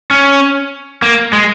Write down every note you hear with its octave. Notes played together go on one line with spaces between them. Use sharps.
C#4
A#3
G#3